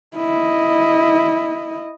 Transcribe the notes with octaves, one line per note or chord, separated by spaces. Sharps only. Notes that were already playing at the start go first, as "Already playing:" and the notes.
E4 D#5